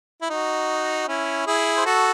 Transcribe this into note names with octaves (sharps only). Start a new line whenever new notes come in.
E4
D#4 F#4
C#4 E4
E4 G#4
C5
F#4 A4